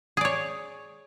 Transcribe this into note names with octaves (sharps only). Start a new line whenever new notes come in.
G#4 C#5 D5